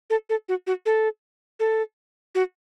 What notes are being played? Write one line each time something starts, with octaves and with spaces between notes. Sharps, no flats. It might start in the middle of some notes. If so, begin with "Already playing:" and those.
A4
A4
F#4
F#4
A4
A4
F#4